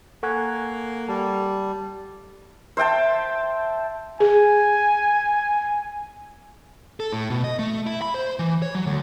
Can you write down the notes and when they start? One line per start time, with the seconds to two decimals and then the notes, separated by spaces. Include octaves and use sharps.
0.23 A#3 A4 F#5 G#5 C#6 F#6 G#6
1.09 G3 A5
2.77 C5 E5 G5 A5
4.20 G#4 G#5
7.00 A4
7.13 A2
7.30 B2
7.44 D#5
7.59 A3
7.87 E4
8.02 B5
8.14 C5
8.39 E3
8.62 C#5
8.75 F#3
8.86 D2